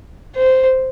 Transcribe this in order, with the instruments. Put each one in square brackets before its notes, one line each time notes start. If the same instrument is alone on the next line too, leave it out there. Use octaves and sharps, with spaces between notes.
[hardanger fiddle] C5